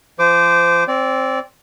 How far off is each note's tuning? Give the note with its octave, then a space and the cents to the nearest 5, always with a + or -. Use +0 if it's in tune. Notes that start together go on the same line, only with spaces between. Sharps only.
F3 -30 C5 -20 D6 +0
C4 +10 D5 -25